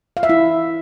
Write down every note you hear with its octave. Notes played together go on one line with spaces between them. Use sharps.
F5
E5
E4